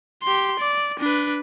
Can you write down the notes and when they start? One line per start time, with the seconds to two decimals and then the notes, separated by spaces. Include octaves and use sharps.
0.23 G4 C6
0.59 D5
1.00 D4 B4